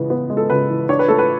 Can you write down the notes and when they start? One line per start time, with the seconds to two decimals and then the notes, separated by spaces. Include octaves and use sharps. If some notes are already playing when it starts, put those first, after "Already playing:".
Already playing: C#3 E3 G#3 B3
0.10 B3
0.30 G#3
0.37 A4
0.50 C#3 B4
0.70 E3
0.89 D4 C#5
0.99 B4
1.08 A3 A4
1.18 B4